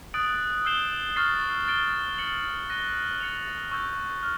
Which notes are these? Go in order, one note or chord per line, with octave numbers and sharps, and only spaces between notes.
D#6 F#6 A6 D7 F#7
E6 G6 C7 E7 G7
C#6 F6 A6 C7
A6 D7 G7
A6 C#7 F#7
F#6 A#6 D#7 G7
A6 C#7 F7
C#6 E6 G6
F6